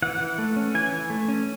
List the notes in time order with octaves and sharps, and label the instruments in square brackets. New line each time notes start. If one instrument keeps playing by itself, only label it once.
[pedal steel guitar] E3 F#5
E3
A3
C#4
E3 G#5
E3
A3
C#4